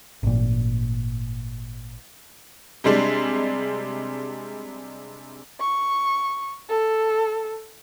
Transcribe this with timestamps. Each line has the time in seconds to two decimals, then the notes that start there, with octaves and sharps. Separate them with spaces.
0.23 G#1 A#2
2.84 C3 G3 G#3 D4
5.60 C#6
6.69 A4